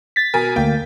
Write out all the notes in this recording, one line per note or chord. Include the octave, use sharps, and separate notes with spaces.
A6 B6
B2 A#4 G#5
D2 A#3 G5